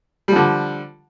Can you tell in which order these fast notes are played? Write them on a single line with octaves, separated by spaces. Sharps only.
G3 F3 D3